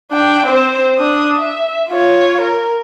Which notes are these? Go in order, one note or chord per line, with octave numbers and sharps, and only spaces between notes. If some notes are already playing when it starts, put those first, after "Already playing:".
D4 G5
C4 C5
D4 D#6
E5
F4 C#5
A#4